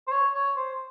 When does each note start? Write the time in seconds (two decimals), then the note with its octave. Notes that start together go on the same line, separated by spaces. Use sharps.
0.07 C5
0.11 C#5
0.34 C#5
0.57 C5